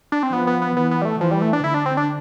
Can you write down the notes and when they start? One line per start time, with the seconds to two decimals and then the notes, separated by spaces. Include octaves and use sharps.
0.12 D4
0.23 C4
0.32 F3 B3
0.47 B3
0.62 B3
0.76 E3 B3
0.91 B3
1.02 G3
1.05 A3
1.20 E3 F3
1.31 G3
1.42 A3
1.53 D4
1.64 D3 E4
1.74 D4
1.86 C4
1.97 D4